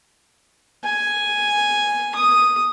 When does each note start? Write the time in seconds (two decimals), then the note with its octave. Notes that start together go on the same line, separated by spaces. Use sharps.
0.83 G#5
2.15 D#6